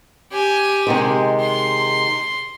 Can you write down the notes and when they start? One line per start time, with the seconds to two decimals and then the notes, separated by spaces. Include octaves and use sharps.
0.31 G4 G#5
0.87 C3 D#3 G#3
1.40 C6